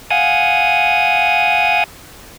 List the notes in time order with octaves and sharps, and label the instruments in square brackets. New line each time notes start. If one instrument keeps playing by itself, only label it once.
[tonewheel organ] F5 F#5 G#5 D#6